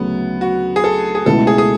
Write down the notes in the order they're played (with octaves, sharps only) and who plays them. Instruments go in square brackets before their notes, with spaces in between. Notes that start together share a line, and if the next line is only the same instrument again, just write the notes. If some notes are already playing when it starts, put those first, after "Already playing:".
Already playing: [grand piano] D2 C#3 F#3 [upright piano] B3
[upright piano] F#4
G#4
A4
G#4
[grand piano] C#2 B2 A3 E4 [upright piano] A4
[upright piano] G#4
G#4